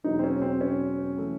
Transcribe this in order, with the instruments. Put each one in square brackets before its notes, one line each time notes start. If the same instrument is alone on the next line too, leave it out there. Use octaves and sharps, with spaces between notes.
[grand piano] E2 B2 F#3 A#3 D#4
C4
C#4
C4
C#4
E3 A3